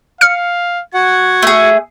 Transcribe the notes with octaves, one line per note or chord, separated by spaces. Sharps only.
F5 F6 C#7
F#4 F#5 G#6
A3 G#4